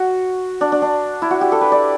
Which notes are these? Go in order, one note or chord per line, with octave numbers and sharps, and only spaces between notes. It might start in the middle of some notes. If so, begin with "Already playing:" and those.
Already playing: F#4
D4
D4
D4
E4
F#4
G4
A4
B4
D5